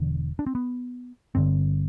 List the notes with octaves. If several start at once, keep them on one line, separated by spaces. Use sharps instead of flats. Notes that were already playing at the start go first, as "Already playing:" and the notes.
Already playing: E1 E2 D3 D4
D4
C4
B3
G1 G2 D3 C4